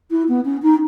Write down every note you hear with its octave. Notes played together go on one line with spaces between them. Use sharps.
E4
B3
C#4
D#4